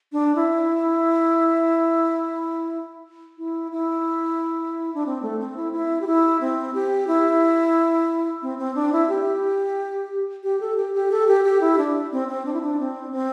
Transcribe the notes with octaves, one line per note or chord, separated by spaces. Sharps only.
D4
E4
E4
E4
D4
C4
A3
C4
E4
E4
G4
E4
C4
G4
E4
C4
C4
D4
E4
G4
G4
A4
G4
G4
A4
G4
G4
E4
D4
C4
C4
D4
E4
D4
C4
C4